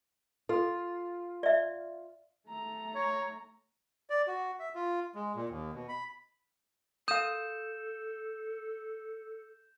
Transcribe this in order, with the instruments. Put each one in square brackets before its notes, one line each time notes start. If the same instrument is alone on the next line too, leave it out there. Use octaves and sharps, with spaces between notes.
[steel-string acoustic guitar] F4 [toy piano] A4
[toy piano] D5 E5
[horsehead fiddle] A3 A#5
[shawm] C#5
[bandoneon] D5
F#4
E5
F4
G#3
A#2
D#2
B2
B5
[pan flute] A4 [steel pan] F5 D#6 [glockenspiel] G6 E7